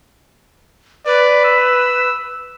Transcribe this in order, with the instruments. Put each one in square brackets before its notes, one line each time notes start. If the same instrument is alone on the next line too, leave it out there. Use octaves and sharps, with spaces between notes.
[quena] B4 [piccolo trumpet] D5
[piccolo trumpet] E6